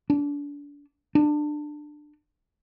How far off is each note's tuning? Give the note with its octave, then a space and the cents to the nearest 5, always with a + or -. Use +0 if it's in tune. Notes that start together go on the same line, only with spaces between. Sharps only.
D4 -30
D4 +20